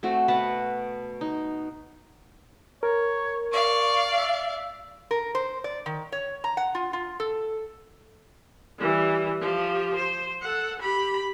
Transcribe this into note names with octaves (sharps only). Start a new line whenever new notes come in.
A3 C4 F#4
B2 B4 F#5 A5
D#4
A#4 C#5
D5 F5 C#6
E5
A#4
C5
D5
D#3
C#5
A#5
F#5
F4
F4
A4
E3 G3
F3 G4
C5
A4 F#5
G4 B5